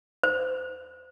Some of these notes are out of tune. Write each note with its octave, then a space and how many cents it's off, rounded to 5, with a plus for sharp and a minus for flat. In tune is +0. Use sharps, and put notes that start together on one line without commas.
C5 -30